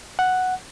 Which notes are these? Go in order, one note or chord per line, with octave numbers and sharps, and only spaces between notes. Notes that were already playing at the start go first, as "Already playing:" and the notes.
F#5